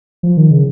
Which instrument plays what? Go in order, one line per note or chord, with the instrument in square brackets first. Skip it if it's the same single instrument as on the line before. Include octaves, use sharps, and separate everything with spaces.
[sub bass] F3
D#3
C#3